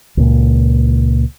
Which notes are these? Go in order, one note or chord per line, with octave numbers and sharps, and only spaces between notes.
C#2 A#2